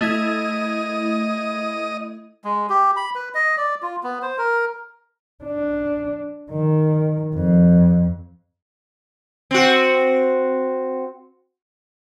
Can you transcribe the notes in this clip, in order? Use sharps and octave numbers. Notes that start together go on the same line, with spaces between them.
A3 E4 D#5 G#6
G#3
G4
B5
B4
D#5
D5
F4
B3
C5
A#4
D4
D#3
F2
C4 F#4